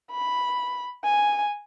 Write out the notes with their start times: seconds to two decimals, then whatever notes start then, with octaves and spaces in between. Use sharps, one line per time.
0.12 B5
1.04 G#5